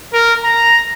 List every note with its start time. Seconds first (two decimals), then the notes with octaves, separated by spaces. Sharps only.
0.13 A#4
0.44 A#5